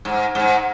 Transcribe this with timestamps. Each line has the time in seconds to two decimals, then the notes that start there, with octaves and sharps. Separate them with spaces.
0.05 G#2
0.35 G#2